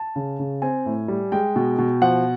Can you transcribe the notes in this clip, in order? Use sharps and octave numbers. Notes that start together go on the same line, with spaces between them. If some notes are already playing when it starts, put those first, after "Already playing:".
Already playing: A5
C#3
C#3
C4 G#5
A2
G3
G#3 G5
B2
B2
F3 F#5